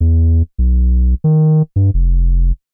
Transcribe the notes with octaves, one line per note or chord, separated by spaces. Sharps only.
E2
B1
D#3
G2
F1